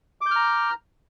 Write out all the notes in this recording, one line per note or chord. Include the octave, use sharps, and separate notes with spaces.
A#5 D6 F6 G6